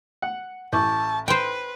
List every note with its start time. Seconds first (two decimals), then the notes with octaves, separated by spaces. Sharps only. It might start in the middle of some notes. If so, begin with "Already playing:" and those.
0.22 F#5
0.73 A1 E4 A5 C#6 D6 G6
1.28 B4 C5 G5 B5 C6 C7